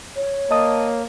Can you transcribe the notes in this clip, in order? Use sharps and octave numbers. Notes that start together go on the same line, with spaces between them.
C#5
A#3 D#5 A5 D#6